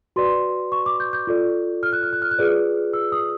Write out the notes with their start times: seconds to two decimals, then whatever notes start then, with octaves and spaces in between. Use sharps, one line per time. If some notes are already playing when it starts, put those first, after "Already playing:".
0.16 F#4 B4 D5 C6
0.72 C#6
0.86 D6
1.00 G6
1.13 G6
1.27 F4 A4 D5
1.83 F6
1.93 F#6
2.03 F6
2.13 F#6
2.22 F6
2.31 F#6
2.38 F4 G#4 B4 D5 F6
2.93 E6
3.12 D#6